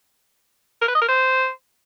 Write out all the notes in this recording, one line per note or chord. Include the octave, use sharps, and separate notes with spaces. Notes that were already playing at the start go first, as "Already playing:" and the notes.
A#4
B4
D#5
A#4
C5